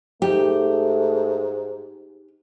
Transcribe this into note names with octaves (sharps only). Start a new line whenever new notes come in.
G#2 A3 D#4 G4